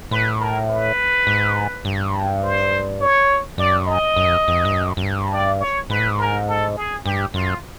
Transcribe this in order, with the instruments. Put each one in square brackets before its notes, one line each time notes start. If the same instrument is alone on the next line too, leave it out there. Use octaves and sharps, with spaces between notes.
[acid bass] A2 [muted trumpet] B4
[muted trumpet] A#4
B4
[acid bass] G#2
G2
[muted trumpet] C5
C#5
[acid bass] F#2 [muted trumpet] D5
[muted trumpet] D#5
[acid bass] F#2
F2
F2
G2
F#2
F#2
G2
[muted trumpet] D5
C#5
[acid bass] G#2 [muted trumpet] B4
[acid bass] A2
G#2
[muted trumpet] A#4
A4
G#4
[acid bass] G2 [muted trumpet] G4
[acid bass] F#2 [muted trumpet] F4